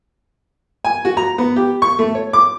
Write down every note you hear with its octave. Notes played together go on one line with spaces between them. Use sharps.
G#5
F#4
A#5
B3
G4
C#6
A3
C#5
D6